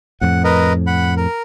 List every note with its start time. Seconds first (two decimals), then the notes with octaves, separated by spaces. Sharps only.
0.21 F2 A2 F#5
0.44 A#4 B4 D#5
0.87 F#5 B5
1.17 A#4